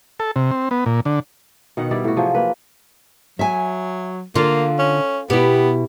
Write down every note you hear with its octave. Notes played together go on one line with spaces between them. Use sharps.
A4
C3
C4
B3
A#2
D3
B2 D#3 B3 F#5
G3 E4 D5
A2 F#4
C3 F3 F#3 G#4
A#3 B4
F#3 E5 G#5
D3 A#3 F4
C#4
B2 B3 E4 G4